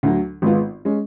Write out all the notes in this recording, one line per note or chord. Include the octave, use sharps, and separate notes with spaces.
D2 D3 F#3
G#1 G#2 G#3 B3 F4
G#3 C#4